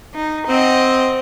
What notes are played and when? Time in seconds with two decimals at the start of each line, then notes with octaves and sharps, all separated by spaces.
0.14 D#4
0.48 C4 D#5 F#5